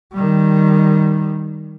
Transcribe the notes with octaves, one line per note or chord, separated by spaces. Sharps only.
D#3 G3